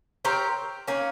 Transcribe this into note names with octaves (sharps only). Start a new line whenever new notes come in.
C4 G4 A#4 C#5
D#3 A#3 C#4